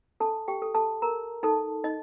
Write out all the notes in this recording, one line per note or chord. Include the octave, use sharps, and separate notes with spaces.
D4 A4 A5
G4 G5
A4
A4 A5
A#4 A#5
D#4 A4 A5
D#4 D#5